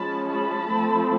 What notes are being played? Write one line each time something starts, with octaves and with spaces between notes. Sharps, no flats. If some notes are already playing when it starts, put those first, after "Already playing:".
Already playing: F3 G#3 C#4 A5 B5
A5 B5
F3 A3 C4